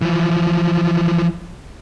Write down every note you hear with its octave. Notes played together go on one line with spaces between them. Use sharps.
E3 F3